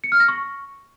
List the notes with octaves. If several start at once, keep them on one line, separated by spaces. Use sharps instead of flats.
C#7
F6
A#6
C#6